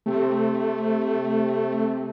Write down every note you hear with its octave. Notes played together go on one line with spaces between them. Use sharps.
C3 A3 C4